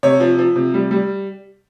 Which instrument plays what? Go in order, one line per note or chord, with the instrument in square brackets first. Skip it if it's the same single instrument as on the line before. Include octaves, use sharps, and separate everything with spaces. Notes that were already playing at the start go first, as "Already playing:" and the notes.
[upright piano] C3 C#5
F3
F3
C3
G3
G3